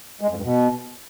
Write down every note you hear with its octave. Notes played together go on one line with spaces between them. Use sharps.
G#3
F2
G2
B2